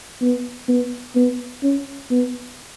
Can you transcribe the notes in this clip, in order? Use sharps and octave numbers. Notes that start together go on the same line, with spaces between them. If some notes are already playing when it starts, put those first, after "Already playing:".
B3
B3
B3
C#4
B3